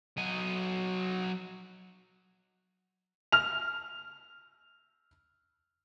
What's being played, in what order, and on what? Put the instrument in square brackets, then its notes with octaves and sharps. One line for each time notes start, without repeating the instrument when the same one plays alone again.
[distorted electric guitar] F#3 D#5
[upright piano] F6 F7